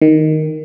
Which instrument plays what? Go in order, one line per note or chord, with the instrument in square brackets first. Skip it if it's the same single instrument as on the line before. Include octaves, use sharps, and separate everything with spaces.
[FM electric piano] D#3